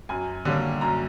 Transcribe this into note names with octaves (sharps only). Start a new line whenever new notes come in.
F#2 G#5
D3 G3 A#3 C#4
F#2 A#5